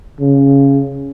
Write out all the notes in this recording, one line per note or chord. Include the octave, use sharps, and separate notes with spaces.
C#3